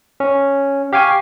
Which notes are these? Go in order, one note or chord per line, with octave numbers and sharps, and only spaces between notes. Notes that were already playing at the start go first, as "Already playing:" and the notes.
C#4
G4 F5 G5 G#5 C#6